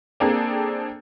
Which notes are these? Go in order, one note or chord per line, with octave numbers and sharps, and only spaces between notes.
A#3 C4 D4 G#4 A4